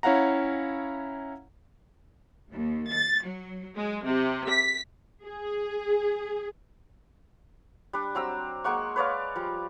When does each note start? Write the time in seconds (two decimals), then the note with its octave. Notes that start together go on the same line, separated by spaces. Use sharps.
0.03 C#4 E4 C#5 F5 F#5 A#5
2.50 D#2
2.88 A6
3.23 F#3
3.75 G#3
4.04 C3
4.49 B6
5.25 G#4
7.93 G3 D4
8.15 F#3 C4 A#5 E6
8.64 G#3 A#3 F#5 C#6
8.96 B4 C#5 D5 F5
9.35 F3 G3